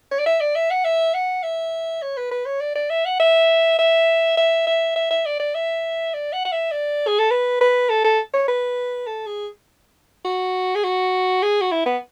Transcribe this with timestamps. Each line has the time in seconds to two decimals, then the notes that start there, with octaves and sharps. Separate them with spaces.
0.11 C#5
0.19 D5
0.26 E5
0.40 D5
0.55 E5
0.71 F#5
0.85 E5
1.14 F#5
1.43 E5
2.02 C#5
2.17 B4
2.31 B4
2.46 C#5
2.61 D5
2.75 D5
2.90 E5
3.05 F#5
3.20 E5
3.79 E5
4.37 E5
4.67 E5
4.96 E5
5.11 E5
5.26 D5
5.40 D5
5.55 E5
6.14 D5
6.33 F#5
6.45 F#5
6.52 E5
6.72 D5
7.07 G#4
7.19 A4
7.31 B4
7.61 B4
7.89 A4
8.04 A4
8.33 C#5
8.48 B4
9.07 A4
9.26 G#4
10.25 F#4
10.76 G#4
10.84 F#4
11.43 G#4
11.61 F#4
11.72 E4
11.86 B3